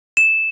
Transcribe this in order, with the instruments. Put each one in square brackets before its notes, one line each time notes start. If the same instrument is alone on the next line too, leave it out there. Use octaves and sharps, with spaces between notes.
[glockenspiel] E7